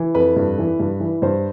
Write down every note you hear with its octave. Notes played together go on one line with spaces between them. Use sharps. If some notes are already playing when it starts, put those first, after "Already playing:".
Already playing: E3
F2 B4
G2
E3
G2
E3
G2 C5